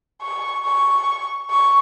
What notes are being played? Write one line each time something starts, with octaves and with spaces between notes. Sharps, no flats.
C#6
C#6
C#6